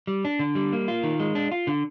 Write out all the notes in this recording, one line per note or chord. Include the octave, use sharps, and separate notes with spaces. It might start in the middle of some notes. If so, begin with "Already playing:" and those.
G3
D4
D3
G3
A#3
F4
D#3
G#3
D4
F4
D3